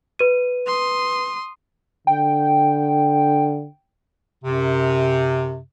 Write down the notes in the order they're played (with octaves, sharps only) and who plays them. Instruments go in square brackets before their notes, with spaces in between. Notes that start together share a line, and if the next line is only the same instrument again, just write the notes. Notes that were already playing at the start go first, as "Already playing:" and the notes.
[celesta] B4 D#7
[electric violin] C6 D#6
[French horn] D3 [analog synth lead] G5
[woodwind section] F#2 C3